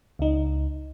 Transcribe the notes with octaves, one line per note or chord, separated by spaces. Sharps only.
C#2 D#4